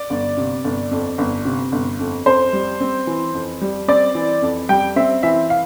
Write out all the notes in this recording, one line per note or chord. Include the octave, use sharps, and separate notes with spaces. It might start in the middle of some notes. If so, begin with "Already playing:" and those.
Already playing: D5
G1
C3
G1
F2
G1
C3
G1
F2
F2 C5
G3
C4
E3
F2
G3
C4 D5
E3
F2
G3 G5
C4 E5
E3 E5
F5